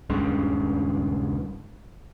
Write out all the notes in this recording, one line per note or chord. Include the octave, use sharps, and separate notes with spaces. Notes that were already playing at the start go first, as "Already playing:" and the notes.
D#1 C#2 G2 C#3